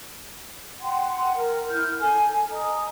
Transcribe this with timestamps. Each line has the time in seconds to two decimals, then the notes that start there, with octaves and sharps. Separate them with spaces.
0.82 F#5 G5 C6
1.36 A#4
1.70 E4 F6 G6
1.99 A4 G#5
2.50 D#5 A#5 D#6